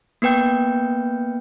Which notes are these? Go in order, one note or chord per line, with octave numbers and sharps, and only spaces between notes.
A#3 B3 B4 G5 G6